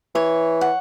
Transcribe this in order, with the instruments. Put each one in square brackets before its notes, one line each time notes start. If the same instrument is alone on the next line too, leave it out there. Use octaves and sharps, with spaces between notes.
[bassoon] E3 [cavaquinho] C#5
[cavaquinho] F#5